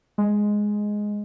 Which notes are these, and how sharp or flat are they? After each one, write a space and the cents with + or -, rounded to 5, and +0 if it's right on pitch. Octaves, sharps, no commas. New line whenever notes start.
G#3 +0